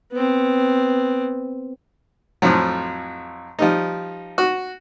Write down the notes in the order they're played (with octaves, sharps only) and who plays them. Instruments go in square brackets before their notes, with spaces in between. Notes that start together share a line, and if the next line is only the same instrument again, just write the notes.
[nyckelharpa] B3 C4
[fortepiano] F2 A2 F3 F#3
F3 G3 D#4
F#4